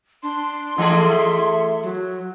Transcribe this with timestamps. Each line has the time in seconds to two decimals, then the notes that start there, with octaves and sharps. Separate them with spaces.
0.23 D4 C6
0.78 E3 A3 G#4 D#5
1.03 E5
1.83 F#3